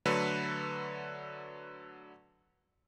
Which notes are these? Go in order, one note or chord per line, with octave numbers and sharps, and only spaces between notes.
D3 F#3 A3 B4